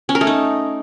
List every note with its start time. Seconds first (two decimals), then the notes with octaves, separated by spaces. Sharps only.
0.09 C#4
0.15 A#4
0.21 A3
0.27 D#4